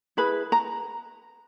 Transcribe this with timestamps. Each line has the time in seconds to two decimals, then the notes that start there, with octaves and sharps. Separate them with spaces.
0.17 E4 G#4 B4 B5
0.52 A#5